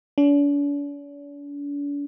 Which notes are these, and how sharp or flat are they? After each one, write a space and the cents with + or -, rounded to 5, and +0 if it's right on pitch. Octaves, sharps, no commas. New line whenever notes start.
D4 -45